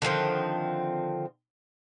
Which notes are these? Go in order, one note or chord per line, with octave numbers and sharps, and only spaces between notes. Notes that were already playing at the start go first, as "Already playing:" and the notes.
D3 D#3 F3 C4